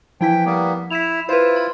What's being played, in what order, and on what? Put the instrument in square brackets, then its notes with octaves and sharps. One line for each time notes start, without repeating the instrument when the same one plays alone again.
[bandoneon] E3 G5 [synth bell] F3 E4 B6
[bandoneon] G3 A#3 B3
[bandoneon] E4 [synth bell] B6 E7 F7
[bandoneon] E4 F4 [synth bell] B4 C5
[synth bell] B5